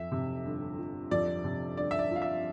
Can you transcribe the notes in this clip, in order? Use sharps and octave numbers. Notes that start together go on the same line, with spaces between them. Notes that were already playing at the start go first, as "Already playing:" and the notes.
Already playing: F2 E5
C3
G1
F3
F2 D5
C3
G1 D5
E5
D5
F3 F5
E5